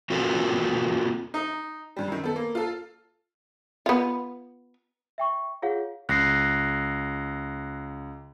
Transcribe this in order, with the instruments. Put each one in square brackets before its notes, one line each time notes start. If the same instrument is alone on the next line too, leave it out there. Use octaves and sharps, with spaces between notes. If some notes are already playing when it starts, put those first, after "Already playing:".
[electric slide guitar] A#3 C4 F4 F#4 A4 B4
[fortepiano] D#4
[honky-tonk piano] G2 G3
F#2 D#3
B3 A4
A#3
F4 A4
[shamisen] B3 F4
[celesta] E5 G5 C#6
F4 G#4 C#5 F5 F#5
[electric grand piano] C#2 [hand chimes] F#6 A#6 C7